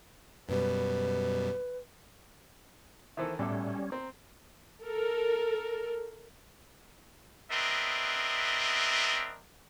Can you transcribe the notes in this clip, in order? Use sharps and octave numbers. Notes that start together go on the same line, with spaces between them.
F#2 B2 G3 B4
D#3 E3 A4 C5 E5
B1 A2 G3 C#4 A4 E5 D6
C4 A#5
A4 A#4
B3 C4 D4 A#4 D#5 E5